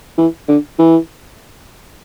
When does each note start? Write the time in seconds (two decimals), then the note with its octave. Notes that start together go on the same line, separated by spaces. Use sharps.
0.18 E3
0.48 D3
0.79 E3